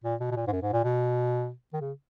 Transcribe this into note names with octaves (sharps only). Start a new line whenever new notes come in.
A#2
B2
B2
A#2
G#2
F#2
G#2
A#2
B2
D#3
C#3